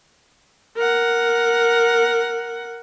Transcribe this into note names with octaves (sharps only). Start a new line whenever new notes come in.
A#4 F#5